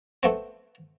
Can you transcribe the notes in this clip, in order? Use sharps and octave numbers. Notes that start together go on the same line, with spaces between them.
A3 B3 C4